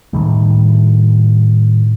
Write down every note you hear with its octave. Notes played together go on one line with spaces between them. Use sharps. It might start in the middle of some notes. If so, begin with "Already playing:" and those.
A2 D#3 G3